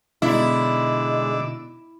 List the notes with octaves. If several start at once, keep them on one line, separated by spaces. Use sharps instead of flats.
B2 D3 G#3 D#4 E4 D5 D6 E6